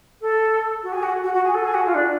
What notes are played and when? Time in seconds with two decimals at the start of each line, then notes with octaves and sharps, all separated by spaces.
0.21 A4
0.83 F#4
0.92 G#4
1.03 F#4
1.23 F#4
1.33 F#4
1.44 G#4
1.54 A4
1.64 G#4
1.74 F#4
1.85 F4
1.94 D4